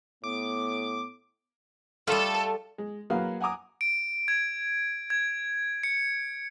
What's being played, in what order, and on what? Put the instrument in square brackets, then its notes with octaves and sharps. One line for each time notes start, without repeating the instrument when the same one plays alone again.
[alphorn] A2 [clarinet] B3 [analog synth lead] D6
[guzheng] G3 F4 [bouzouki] A3 [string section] A4
[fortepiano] G#3
F#3 A#3 G#4 B4 F5 F#5
F#5 G#5 A#5 D6 D#6
[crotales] D7
G#6
G#6
C#7